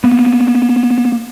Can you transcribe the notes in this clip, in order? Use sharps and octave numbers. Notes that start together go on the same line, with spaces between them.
A#3 B3